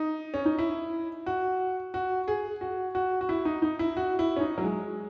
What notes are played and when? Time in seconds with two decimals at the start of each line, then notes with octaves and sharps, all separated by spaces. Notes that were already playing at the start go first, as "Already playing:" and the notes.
Already playing: D#4
0.34 C#4
0.46 D#4
0.59 E4
1.26 F#4
1.94 F#4
2.28 G#4
2.61 F#4
2.95 F#4
3.21 F#4
3.29 E4
3.45 D#4
3.62 D#4
3.79 E4
3.97 F#4
4.19 E4
4.36 C#4
4.41 D#4
4.58 F#3
4.63 G#3